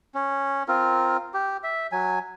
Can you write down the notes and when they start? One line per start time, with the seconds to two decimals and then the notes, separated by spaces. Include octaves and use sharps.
0.15 C#4
0.68 C4 F4 A#4
1.34 G4
1.64 E5
1.92 F#3 G#5